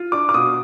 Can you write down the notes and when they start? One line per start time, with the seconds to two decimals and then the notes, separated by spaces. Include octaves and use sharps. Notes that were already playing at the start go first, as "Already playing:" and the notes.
Already playing: F4
0.12 D4 D6
0.29 D6
0.34 B2 D#6